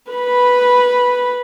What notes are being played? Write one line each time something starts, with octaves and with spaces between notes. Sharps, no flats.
B4 B5